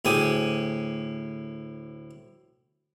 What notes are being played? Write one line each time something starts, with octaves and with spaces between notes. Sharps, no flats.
D2 A2 G4 G#4 D#6